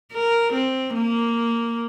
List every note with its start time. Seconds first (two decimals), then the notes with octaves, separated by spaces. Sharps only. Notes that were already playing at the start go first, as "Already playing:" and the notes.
0.13 A#4
0.53 C4
0.94 A#3